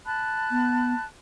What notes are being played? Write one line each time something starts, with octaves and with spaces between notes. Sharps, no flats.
A5 B5 F#6
B3